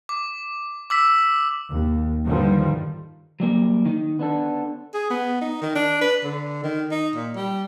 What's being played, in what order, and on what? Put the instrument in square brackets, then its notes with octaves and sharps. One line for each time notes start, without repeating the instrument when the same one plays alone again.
[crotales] D6
D6 E6 B6
[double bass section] D#2
G2 D3 D#3 F3 G3
[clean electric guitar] F#3 G3 A#3
D#3 D#4
B3 D4 A4
[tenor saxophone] G#4
B3
D#4
D#3
D4
B4
D3
D#3
D#4
A#2
G3